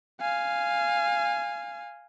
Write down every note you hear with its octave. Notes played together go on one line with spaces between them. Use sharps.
F5 G#5